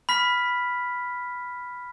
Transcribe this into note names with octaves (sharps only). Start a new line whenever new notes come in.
B5 F6 B6